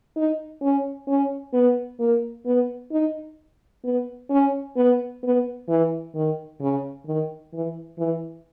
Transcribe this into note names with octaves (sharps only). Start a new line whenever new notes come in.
D#4
C#4
C#4
B3
A#3
B3
D#4
B3
C#4
B3
B3
E3
D#3
C#3
D#3
E3
E3